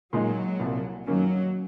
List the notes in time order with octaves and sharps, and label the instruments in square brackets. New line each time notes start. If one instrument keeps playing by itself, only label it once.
[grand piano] A#2 G#3 D#4 [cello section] F#3
[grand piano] C2 A#2 F3
[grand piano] F#2 D#3 A#3 C#4 [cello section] F#3